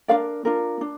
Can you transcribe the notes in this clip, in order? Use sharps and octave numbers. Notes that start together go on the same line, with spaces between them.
D4 F4 A#4 D5 F5
D4 F4 A#4
D4